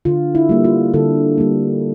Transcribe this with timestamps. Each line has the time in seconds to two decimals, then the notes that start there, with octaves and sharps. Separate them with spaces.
0.05 D3 F4
0.35 E4
0.49 G3 A#3
0.64 F4
0.94 D3 A4
1.38 G3 A#3